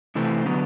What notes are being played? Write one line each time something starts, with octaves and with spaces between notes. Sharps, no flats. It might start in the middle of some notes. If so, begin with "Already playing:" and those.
C3 E3 A3 C4
D3 F#3 B3